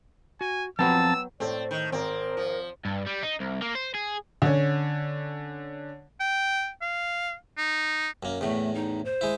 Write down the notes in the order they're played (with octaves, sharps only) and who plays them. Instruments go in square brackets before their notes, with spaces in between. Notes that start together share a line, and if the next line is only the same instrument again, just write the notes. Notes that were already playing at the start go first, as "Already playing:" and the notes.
[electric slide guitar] F#4 [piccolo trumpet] G#5
[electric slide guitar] F3 C4 A#5 [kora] F#3 B3 G5 [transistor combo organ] A5 [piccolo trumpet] E6
[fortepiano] A2 A3 [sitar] C4 [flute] D5
[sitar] D#3 [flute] G6
[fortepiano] G#1 A#5 [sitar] C4 [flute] A#4
[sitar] F3
[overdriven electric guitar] G2
G3
D#4
C2
A#3
C5
G#4
[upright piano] D3 C#4
[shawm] G5
F5
D#4
[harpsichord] F#2 A#3
[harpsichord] E2 A2 [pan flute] A3
[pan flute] D#4
C5
[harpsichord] G#3 E4